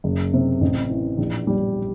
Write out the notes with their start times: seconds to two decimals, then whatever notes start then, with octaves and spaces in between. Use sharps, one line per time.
0.04 F#1
0.33 C3
0.61 A1
0.90 E3
1.18 A#1
1.47 G3